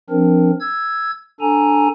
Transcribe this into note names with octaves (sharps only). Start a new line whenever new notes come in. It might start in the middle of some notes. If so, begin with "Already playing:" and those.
F3 C4 D4 A#4
E6 G#6
D4 A4 G#5 A#5